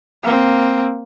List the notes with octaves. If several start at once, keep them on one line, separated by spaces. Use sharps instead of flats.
A#3 C4